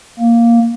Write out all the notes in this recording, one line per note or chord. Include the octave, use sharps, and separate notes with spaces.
A#3